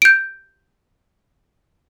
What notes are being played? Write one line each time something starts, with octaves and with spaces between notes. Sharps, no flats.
G6 D7